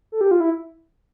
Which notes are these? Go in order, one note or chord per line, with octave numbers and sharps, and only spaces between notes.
A4
G4
F4
E4